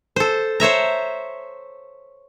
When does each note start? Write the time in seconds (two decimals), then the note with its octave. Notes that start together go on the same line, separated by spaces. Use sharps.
0.16 A4 C5
0.60 C5 C#5 E5 A#5